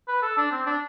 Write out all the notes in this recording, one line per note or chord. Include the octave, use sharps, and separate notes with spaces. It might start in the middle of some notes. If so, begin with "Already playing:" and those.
B4
A4
D4
C4
D4